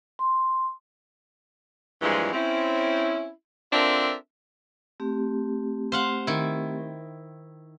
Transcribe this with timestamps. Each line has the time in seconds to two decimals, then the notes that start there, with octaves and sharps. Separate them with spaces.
0.19 C6
2.02 G2 A#2 E3 F3 G#3
2.33 C4 C#4 E4
3.73 C4 D4 F4 A4 A#4 E5
5.00 A3 C4 G4
5.92 C5 F5 F#5
6.27 D#3 E4